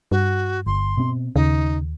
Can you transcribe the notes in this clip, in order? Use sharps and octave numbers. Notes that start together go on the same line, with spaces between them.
G2 F#4
G1 C6
B2 C4
D#2 C#3 D#4